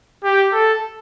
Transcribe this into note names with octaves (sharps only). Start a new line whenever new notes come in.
G4
A4